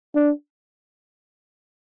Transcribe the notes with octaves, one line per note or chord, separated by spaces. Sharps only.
D4